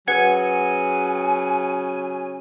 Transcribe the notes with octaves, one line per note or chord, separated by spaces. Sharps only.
C#3 F#3 B4 F#5 G#5 G#6